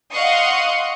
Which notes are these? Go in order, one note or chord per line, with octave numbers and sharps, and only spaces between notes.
D#5 F5 F#5 C6 C#6 D#6